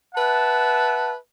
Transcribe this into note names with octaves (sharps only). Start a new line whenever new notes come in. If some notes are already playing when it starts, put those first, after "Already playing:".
B4 E5 F#5 A5